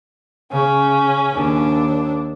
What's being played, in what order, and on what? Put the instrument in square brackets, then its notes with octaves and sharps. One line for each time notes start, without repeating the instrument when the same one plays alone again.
[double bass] C#3 [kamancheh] C#4
[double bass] D#2 D4